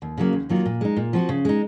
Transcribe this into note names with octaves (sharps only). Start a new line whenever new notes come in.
D#2
C#3 F#3 A#3
D#2
D#3 F#3 A#3 F4
A#2
G#3 D#4
A#2
F3 C4 F#4
C#3
G#3 D#4